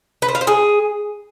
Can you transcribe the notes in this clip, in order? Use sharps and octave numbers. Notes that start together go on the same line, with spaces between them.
B4
C5
F5
C5
G#4